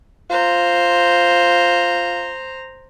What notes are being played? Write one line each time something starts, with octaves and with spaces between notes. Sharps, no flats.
F4 C5 A#5